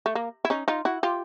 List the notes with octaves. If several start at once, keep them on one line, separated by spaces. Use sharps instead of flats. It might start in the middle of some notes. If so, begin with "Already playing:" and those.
A3
A#3
E4
C#4 D#4
D#4 F4
E4 F#4
F4 G4